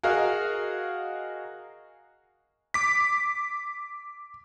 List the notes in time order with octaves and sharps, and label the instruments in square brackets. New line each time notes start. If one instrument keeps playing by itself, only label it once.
[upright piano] F#4 G#4 A#4 D#5 F5
[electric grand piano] D6 B6